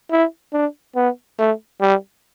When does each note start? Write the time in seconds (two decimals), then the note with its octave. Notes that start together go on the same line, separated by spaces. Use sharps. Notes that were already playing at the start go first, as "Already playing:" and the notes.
0.11 E4
0.53 D4
0.96 B3
1.39 A3
1.81 G3